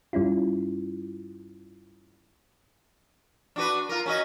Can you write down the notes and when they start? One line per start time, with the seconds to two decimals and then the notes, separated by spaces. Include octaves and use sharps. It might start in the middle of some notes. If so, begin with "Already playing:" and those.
0.13 G2 G3 C#4 E4 F4
3.56 D4 F#4 B4
3.89 F4 A#4
4.06 C#4 F#4 D#5